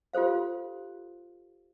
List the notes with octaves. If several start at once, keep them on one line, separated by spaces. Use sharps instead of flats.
F4 G4 A4 C5 F5